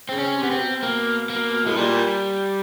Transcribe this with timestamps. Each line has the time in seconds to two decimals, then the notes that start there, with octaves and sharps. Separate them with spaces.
0.09 C#3 C4
0.19 C#4
0.35 C3
0.43 B3
0.51 C4
0.59 B2
0.83 A#3
1.30 A#3
1.66 A2 G#3
1.76 A#2 G3